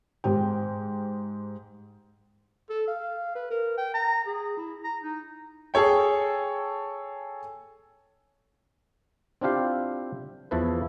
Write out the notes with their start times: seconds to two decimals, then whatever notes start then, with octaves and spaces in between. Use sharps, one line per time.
0.24 G#2 G4 G5
2.70 A4
2.88 F5
3.35 B4
3.51 A#4
3.78 G5
3.94 A#5
4.26 G#4
4.57 E4
4.84 A#5
5.02 D#4
5.74 G#4 A4 C#5 G5
9.41 C4 D4 E4 F4 G4 F5
10.51 E2 F3 E4 A4 B4